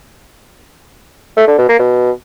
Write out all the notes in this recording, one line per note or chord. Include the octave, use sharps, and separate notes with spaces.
A3
D3
B2
A#3
B2